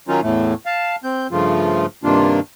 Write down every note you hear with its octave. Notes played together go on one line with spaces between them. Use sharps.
D#3 F#3 C#4 D#4 F4
E2 A2 A3
F5 A5
C4 G6
G2 C#3 F3 A3 F4
G2 C3 D#3 A#3 D4 F4